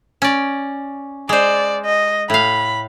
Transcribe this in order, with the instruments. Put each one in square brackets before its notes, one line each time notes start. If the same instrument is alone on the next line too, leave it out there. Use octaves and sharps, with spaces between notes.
[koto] C#4 D5
[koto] G#3 C5 [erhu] D5
[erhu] D#5
[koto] A2 F5 [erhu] B5